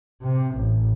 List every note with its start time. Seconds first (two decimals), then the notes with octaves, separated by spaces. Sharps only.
0.22 C3
0.55 A1